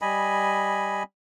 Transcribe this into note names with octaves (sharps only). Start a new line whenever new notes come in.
G3 D#5 G#5 B5